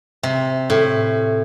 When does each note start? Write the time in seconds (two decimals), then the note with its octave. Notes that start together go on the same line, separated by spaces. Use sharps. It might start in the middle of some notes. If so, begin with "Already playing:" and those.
0.23 C3
0.70 A2